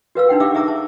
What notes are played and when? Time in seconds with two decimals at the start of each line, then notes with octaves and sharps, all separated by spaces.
0.15 F#4 B4 F5 E6
0.29 D4 D#4 F#5 G5
0.40 G4 E5 F5 D6 E6
0.55 G#4 E5 A#5 D6 E6
0.68 A5